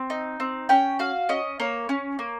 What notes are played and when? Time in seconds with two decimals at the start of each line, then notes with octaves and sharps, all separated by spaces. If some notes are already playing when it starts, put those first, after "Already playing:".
Already playing: C4
0.10 D#4
0.40 C4
0.69 C#4 G5
0.99 F#4 F5
1.29 C#4 D#5
1.60 A#3 C#5
1.89 C#4
2.19 A#3